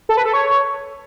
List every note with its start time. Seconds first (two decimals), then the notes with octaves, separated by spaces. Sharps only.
0.09 A4
0.17 B4
0.25 A4
0.33 C#5